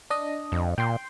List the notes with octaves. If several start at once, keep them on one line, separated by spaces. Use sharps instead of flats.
D4 D#5
F2
A#2 G5 C6